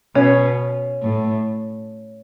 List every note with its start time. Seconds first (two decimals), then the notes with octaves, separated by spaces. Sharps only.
0.15 B2 C#4
1.02 A2